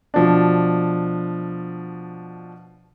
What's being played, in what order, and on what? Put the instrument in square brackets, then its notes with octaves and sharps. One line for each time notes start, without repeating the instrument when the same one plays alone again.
[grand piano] B2 F3 D4